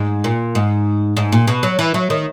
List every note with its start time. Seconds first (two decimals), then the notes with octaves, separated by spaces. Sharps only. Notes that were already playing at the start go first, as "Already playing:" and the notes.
Already playing: G#2
0.24 A#2
0.55 G#2
1.17 G#2
1.32 A#2
1.47 B2
1.63 F#3
1.79 E3
1.94 F#3
2.10 D#3